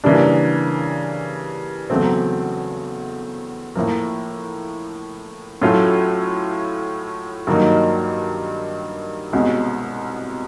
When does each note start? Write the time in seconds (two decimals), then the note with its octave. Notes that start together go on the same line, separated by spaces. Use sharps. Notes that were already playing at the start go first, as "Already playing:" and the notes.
0.04 C#3 E3 G3 A#3 D4
1.90 E2 C#3 F#3 A3 C4
3.75 A2 F3 A#3
5.62 A2 F#3 A3 C#4 F4
7.47 G2 D#3 F#3 A#3 D#4
9.33 C2 B2 G#3 C#4